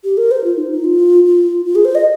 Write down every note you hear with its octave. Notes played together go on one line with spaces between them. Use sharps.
G4
A#4
C5
F4
D#4
D#4
F4
F4
F4
G#4
C5
D#5